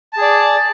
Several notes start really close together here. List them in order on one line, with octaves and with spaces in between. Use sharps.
A5 G#4 D5